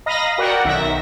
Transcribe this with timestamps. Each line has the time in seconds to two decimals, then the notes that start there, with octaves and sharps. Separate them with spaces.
0.06 D#5 F5 A#5 B5 D#6 A#6
0.38 F#4 A#4 D5 F#5 G5
0.65 B1 D#3 E5 A#6